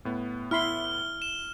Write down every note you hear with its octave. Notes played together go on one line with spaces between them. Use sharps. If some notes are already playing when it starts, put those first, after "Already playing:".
A2 B3
E4 B5 C6 F6 G7
E7